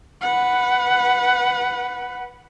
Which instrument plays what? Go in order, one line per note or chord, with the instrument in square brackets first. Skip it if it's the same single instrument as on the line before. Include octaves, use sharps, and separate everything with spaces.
[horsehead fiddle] B4 F#5